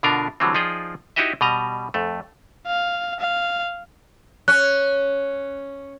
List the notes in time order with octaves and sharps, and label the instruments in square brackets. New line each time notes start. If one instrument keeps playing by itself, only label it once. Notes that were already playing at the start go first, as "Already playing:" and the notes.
[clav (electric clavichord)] B2 D3 D4 F4 A#4
D3 E3 F#3 G3 C4
F3 D#4 F4 G#4 D5 G5
D#4 E4 F#4 G4 D#5 E5
B2 G3 D#5 A#5
F2 A3
[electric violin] F5
F5
[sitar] C#4 [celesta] F#6